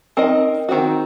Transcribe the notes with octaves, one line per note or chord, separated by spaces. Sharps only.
C4 D#4 A#4 D#5
D#3 F#3 C4 F#4